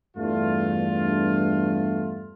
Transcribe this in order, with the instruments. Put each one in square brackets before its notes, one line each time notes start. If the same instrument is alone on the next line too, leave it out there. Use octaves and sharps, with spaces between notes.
[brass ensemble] E2 G2 A3 F4